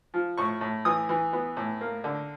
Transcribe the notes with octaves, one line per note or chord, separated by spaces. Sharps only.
F3
A2 C#6
A2
E3 D#6
E3
B3
A2
A#3
D3